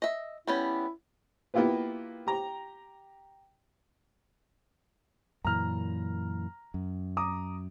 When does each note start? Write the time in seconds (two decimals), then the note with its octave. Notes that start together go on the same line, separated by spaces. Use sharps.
0.02 D#5 E5
0.47 G3 B3 C#4 E4
1.54 A#3 B3 E4 F4 G4 B4
2.27 G4 A#5
5.45 F#2 A#2 E3 A#5 F6
6.74 F#2
7.17 A#5 D6 D#6